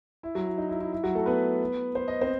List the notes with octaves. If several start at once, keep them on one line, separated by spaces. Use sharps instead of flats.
E4
F#3 F#4
E4
D#4
E4
E4
E4
F#3 F#4
A3 A4
B3 B4
C5
D#5
C4 C5